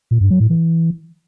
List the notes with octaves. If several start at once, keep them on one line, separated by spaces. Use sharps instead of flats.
A#2
G2
F#3
A2
E3